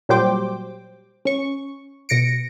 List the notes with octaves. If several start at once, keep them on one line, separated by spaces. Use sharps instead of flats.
A#2 F#3 G3 C5 G5 D6
C#4 C#6
B2 A#6 C#7 D7